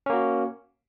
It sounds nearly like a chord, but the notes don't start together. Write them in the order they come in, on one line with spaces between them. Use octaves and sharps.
C#4 A#3 F#4